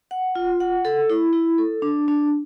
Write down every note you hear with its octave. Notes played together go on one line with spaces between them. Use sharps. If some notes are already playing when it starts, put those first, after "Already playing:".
F#5
F4
F#5
A4
E4
E4
A4
D4
D4